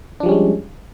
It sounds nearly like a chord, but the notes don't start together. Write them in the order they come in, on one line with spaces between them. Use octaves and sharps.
D4 F3 G3 C#4 G#3